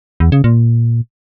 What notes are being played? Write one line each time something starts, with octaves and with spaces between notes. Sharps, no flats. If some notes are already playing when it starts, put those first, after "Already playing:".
E2
C#3
A#2